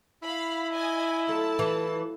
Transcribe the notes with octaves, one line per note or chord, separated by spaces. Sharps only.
E4 F5 B5
D#5 G#5
F#3 A3 F4 A5
E3